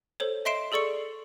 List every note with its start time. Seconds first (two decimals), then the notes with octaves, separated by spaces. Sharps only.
0.20 A4 C5 C#5
0.45 D#5 E5 C6 C7 D7 E7
0.72 G#4 A4 D5 C#6 C#7